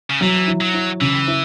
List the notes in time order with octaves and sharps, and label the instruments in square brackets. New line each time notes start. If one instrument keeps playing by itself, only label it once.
[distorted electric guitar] C#3
[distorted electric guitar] E3 [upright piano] F#3
[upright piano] E4
[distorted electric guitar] F#3
[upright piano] E4
[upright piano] C#3 [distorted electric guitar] E3
[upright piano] E4